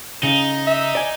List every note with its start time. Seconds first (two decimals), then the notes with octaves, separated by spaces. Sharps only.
0.23 C#3 D#4
0.67 E5
0.95 D5 G#5